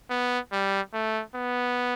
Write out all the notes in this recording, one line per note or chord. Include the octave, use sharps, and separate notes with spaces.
B3
G3
A3
B3